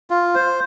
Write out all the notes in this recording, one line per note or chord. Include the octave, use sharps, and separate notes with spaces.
F4
C5